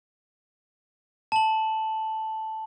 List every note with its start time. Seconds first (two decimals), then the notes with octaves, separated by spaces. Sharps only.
1.32 A5 F#7